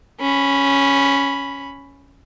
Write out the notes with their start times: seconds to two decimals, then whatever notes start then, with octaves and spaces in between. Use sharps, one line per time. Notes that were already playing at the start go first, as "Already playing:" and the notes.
0.20 C#4 B5